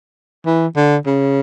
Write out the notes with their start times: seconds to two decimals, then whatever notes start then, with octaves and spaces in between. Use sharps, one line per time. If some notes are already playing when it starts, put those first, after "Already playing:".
0.46 E3
0.76 D3
1.06 C#3